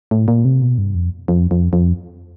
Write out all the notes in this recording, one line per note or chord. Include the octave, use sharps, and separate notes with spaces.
A2
A#2
C3
B2
G2
F2
F2
F2
F2